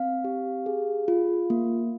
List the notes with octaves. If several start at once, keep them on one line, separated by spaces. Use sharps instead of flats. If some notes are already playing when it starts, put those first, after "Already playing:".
Already playing: C4 F5
G4
G#4
F4
A#3